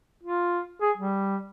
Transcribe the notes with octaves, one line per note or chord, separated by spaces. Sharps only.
F4
G#4
G3